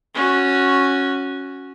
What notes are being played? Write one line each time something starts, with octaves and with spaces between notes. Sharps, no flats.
C#4 F#4